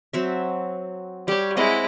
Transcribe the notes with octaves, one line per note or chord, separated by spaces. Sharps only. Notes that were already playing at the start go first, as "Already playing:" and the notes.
F#3 C4 E5
G3 G4 C#5
G#3 C4 E4 D#5 F#5